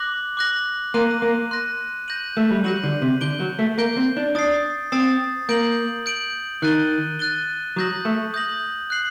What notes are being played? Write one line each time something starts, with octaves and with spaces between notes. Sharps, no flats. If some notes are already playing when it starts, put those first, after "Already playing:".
Already playing: D6 F#6 A#6 F#7
D6 F#6 A#6 F#7
A#3 C6 F#6 A#6 D#7
A#3
C6 F#6 A#6 D#7
G6 A#6 D#7 F#7
A3
G3
F#3 G6 A#6 D#7 F#7
D3
C3
D3 G6 D7 G7
F#3
A3
A#3 G6 D7 G7
C4
D4
D4 D#6 A6 C7
C4 D#6 A6 C7
A#3 G6 D7 F#7
G6 D7 F#7
D#3 F#6 A6 D#7 G7
F#6 A6 D#7 G7
F#3 D#6 G6 A#6 F#7
A3
D#6 G6 A#6 F#7
F#6 C7 F#7